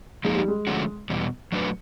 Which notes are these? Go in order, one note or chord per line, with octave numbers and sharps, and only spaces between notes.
F3 G#3 A#3 D#4
G3
G#3
D3 F3 A3 C#4 F#4
E2 B2 G3
F#3 A3 D4 F#4 B4